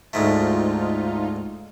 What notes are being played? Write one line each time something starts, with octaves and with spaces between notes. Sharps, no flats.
D2 G#2 A3 D#4 F4